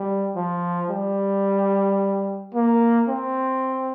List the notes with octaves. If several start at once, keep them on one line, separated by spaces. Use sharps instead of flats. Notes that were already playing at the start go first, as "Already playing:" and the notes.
Already playing: G3
F3
G3
A#3
C4